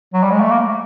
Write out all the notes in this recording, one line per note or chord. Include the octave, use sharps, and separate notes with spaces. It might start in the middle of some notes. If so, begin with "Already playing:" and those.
F#3
G3
G#3
A3
A#3